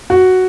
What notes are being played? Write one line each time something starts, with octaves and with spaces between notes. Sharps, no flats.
F#4